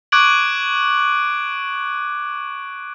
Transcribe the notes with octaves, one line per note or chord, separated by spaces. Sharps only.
C#6 D6 F#6 G#6 D7 F#7